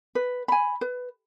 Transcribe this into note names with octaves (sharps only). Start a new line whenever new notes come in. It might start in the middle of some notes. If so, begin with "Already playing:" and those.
B4
G#5 B5
B4